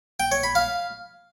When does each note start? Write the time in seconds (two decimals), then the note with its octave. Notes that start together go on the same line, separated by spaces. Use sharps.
0.20 G5
0.32 C#5
0.43 B5
0.55 F5